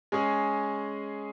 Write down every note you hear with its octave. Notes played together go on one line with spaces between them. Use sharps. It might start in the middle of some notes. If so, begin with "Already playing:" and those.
G#3 C#4 G#4